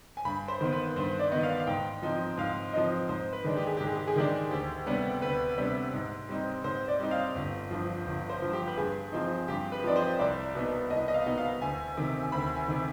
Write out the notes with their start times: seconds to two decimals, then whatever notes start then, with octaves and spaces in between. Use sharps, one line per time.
0.17 G#5
0.25 G2 B5
0.48 C5
0.61 D#3 B3 C5
0.72 B4
0.96 G2 C5
1.19 D5
1.32 D#3 B3 D#5
1.43 F5
1.60 F5
1.67 G#2 G5
2.02 F3 C4 D#4
2.38 G#2 F5
2.73 F3 C4 D#4 D#5
3.09 G#2 C5
3.33 B4
3.44 D#3 G#3 D4
3.57 G4
3.67 G#4
3.77 G#2 G4
3.87 G#4
3.97 G4
4.07 G#4
4.16 D#3 G#3 D4 G4
4.51 D2 G4
4.86 C3 G3 B3 D4
5.22 D2 B4
5.58 C3 G3 B3 D4
5.94 G#2
6.29 G3 C4 D#4
6.64 G#2 C5
6.88 D5
7.00 G3 C4 D#4
7.11 F5
7.35 G1
7.71 G2 F3
8.06 G1
8.30 C5
8.42 G2 F3
8.53 G4
8.67 B4
8.77 G2 G#4
9.12 F3 C4 D#4
9.48 G2 G4
9.72 B4
9.84 F3 C4 D#4 D5
9.96 C5
10.19 C2 D5
10.55 B2 B3 D#4
10.90 C2 D#5
11.08 D#5
11.14 F5
11.26 B2 B3 D#4
11.38 F5
11.61 D2 G#5
11.97 C3 D#3
12.22 G#5
12.32 D2 B5
12.56 G#5
12.68 C3 D#3